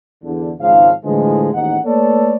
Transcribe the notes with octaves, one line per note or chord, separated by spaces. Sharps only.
E2 D3
G#1 G#2 C#3 F3 F5
A2 D3 E3 F3 G#3
A1 D#2 G#2 D#4 F#5
A3 A#3 A4 B4 C#5 D5